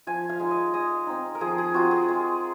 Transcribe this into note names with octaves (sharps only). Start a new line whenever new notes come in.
F3 G#5
F5
G#3 D#4
D#5
G#3 D#5
C4 D#4
A#4
F3 G#4
G#4
C4 F4 F#4
G#4
G#3 G#4